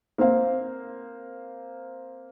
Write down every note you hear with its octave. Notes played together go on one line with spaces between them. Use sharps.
A#3 C4 C5 F5